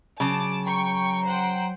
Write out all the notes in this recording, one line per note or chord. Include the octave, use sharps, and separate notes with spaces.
C#3 F#3 A5 D6
G5 A#5 C#6
C5 F#5 G5